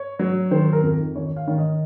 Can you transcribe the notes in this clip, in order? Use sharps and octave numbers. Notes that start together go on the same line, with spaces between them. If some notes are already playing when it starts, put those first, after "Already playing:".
Already playing: C#5
F#3
D#3 C5
A#4
F2
D#3 C#5
F5
D#3 C#5
D#5